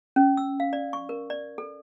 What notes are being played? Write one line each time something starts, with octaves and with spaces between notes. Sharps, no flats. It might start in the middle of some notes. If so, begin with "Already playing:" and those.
C#4
E6
F5
D5
C#6
A#4
D5
A4